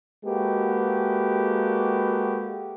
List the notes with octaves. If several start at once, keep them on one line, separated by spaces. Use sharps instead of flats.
G#3 A#3 F#4 G4 A4 B4